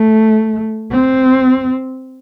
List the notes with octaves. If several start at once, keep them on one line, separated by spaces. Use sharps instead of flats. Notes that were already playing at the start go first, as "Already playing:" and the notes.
Already playing: A3
C4